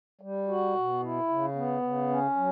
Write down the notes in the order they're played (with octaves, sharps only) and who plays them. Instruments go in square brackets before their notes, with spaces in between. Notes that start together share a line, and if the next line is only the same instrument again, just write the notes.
[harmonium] G3
F#4
B2
E4
C#3
B3
C#3
C#4
F#3